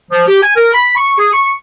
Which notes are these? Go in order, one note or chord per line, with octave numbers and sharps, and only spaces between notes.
F3
G4
G#5
A#4
B5
C#6
G#4
C#6